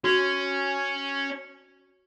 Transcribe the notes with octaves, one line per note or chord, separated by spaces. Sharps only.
C#4 F#4